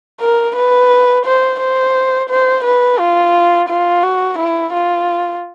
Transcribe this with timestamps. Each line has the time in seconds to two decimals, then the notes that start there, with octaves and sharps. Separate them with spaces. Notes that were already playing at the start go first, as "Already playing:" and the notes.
0.21 A#4
0.55 B4
1.25 C5
1.60 C5
2.29 C5
2.64 B4
2.99 F4
3.69 F4
4.03 F#4
4.38 E4
4.73 F4